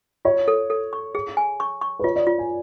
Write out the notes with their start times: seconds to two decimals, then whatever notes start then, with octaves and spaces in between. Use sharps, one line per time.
0.25 F4 C#5
0.48 A4
0.70 A4
0.93 C#6
1.15 G#4
1.37 G#5
1.60 C#6
1.81 C#6
1.99 B4
2.04 F4 C#5
2.16 D5
2.27 F4
2.38 G#5